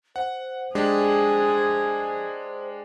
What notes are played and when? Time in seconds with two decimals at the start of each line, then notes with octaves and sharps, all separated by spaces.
0.16 C5 F#5
0.75 G#3 D4 G4 G#4